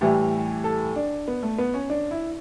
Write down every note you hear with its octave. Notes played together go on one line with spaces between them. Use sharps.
A2 E3 G3 G4
A4
D4
B3
A3
B3
C#4
D4
E4